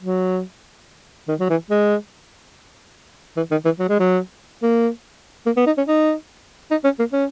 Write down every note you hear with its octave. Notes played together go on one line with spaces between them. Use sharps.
F#3
D#3
F#3
E3
G#3
E3
D#3
E3
F#3
G#3
F#3
A#3
A#3
B3
D#4
C#4
D#4
D#4
C#4
A#3
C#4